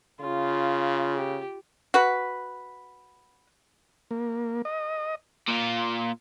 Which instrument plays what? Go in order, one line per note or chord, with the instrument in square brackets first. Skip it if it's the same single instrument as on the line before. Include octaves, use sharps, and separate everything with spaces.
[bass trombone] C#3 [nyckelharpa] F4
[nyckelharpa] G4
[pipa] F#4 B4
[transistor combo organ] A#3
D#5
[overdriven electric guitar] A#2 F4